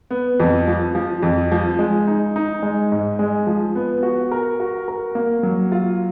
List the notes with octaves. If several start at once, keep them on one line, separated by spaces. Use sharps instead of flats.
B3
F2
F3
F3
F2
F3
G#3
D#4
D#4
G#3
G#2
G#3
F3
B3
F#4
A#4
F#4
A#4
A#3
F#3
F4